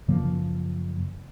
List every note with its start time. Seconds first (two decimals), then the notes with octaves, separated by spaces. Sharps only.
0.08 F#2 C#3 F3 A#3